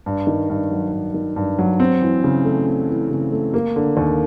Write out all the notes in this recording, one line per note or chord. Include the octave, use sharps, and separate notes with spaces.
G2
D#3
G2
F#3
G2
D#3
G2
F#3
C4
E3
C#3
A3
C4
E3
C#3
A3
A#3
D3
D#2